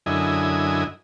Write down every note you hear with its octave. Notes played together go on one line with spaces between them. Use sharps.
F#2 D3 E4 D#5 G#5